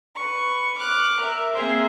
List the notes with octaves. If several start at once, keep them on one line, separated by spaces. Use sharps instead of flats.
B4 C#6
D6 F6 F#6
A#4 E5
A#3 C4 G#4 A#4 C5 E5